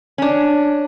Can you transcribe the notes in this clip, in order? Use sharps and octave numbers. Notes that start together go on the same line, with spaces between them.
C#4 D4